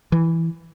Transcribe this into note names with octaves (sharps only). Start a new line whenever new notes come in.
E3